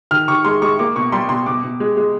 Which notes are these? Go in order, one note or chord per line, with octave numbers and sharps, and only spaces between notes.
D#3 F6
D#3 C#6
G#3 C6
G#3 C#6
A#3 D6
B2 C#6
G3 C6
B2 C6
B2 D6
B2
G#3
G#3